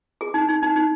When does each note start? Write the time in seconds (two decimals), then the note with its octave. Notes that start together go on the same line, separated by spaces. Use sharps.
0.21 G#4
0.34 D#4
0.49 D#4
0.62 D#4
0.76 D#4